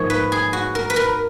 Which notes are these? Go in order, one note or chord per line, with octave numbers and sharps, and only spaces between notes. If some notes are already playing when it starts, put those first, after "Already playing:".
Already playing: G#2 F3 A#3 C#5 D#5
B4
G#4
F#4
A#4
B4
A#4